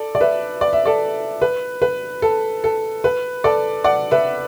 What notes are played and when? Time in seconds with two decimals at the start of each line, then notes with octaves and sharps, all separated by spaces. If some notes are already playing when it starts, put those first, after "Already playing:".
Already playing: A4 D5
0.15 D5
0.20 B4 E5
0.61 D5
0.73 E5
0.86 A4 D5
1.42 B4
1.82 B4
2.22 A4
2.64 A4
3.04 B4
3.44 A4 D5
3.84 D5 F#5
4.11 B4 E5